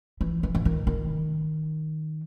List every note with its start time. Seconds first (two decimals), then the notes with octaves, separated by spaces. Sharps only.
0.21 E3
0.43 E3
0.55 E3
0.65 D#3
0.87 D#3